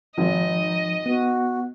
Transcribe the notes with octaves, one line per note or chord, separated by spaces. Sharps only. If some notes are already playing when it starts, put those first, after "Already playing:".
G#1 F3 D#4 D#5
B3 F#4